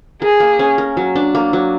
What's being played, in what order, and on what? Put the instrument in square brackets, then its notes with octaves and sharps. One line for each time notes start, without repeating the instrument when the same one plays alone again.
[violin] G#4 [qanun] A#4
[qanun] A#3
C#4
A#4
F#3
D4
A#3
F#3